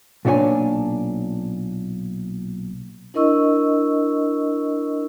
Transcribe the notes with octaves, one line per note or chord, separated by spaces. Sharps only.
B1 A#2 D4 F#4 C#5 G#5
D4 E4 A#4 D#5 C#6 E6